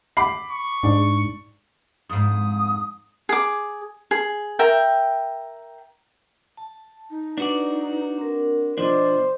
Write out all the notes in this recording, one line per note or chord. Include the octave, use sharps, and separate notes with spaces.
B5 D6 C7
C#6
G#2 D4
F2 G#2 D#6
G#4 D6
G#4
A#4 E5 G5
A5
D#4
D4 F#4 B4 D5
C4 A#4
B2 F3 D4 F4 C5 D5 D#5 D6